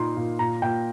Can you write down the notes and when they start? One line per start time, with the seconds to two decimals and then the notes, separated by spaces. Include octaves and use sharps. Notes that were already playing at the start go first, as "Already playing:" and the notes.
Already playing: A#2 A#3 D#4 C6
0.17 A#2
0.39 A#2 A#5
0.62 A#2 G5